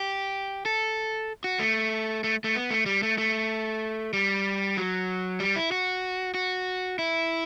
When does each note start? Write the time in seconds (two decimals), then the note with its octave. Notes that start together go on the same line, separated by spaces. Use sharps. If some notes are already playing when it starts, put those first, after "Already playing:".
Already playing: G4
0.65 A4
1.44 F#4
1.59 A3
2.24 A3
2.44 A3
2.55 B3
2.71 A3
2.86 G3
3.03 A3
3.18 A3
4.13 G3
4.77 F#3
5.40 G3
5.56 E4
5.71 F#4
6.34 F#4
6.99 E4